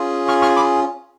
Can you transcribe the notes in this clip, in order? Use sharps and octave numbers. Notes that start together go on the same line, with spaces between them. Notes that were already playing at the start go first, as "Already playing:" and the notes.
Already playing: C#4 F4 G#4
C#6 F6
C#6 F6
B5 D6